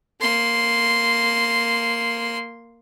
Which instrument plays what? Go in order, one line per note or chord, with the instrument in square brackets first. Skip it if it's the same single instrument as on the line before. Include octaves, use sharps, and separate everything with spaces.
[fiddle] A#3 C6